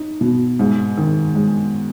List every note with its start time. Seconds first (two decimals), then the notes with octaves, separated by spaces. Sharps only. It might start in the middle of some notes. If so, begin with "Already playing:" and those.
Already playing: D#4
0.21 B2
0.59 G#2
0.97 D#3
1.35 G#3